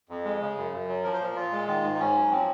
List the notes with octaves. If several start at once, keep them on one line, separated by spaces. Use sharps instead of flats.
F2
G#3
C#3
F#2
F#2
F#3
F3 A#4
C5
A#2 A#4
A#2 F4
G#3
D#3 F4
G#2
D#4
G#2 C#4
F#3
F3 C4